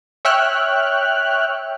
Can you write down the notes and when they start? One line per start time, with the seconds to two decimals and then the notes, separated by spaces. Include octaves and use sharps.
0.25 C#5 E5 G5 F6 F#6